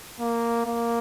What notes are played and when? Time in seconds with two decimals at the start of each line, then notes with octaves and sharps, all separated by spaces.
0.20 A#3
0.66 A#3